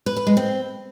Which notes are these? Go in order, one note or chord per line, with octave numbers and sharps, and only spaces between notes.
B4
B4
G#3
C4